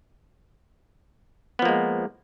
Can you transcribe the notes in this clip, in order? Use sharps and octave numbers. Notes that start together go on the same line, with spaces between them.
F3 G#3 A#3 B3